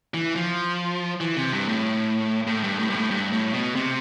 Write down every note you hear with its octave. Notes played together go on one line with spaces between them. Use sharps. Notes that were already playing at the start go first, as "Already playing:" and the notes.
E3
F3
E3
C3
G2
A2
A2
G2
A2
G2
A2
G2
A2
B2
C3